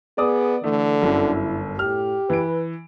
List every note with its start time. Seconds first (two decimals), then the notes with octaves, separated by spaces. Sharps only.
0.18 B3 G#4 D5 D6 D#6
0.64 D3 E3 A3
1.01 G1 F#2 E4
1.79 A2 G4 F6
2.30 E3 B4 D7